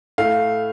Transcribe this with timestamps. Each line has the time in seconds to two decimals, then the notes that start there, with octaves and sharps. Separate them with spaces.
0.18 A2 A3 F5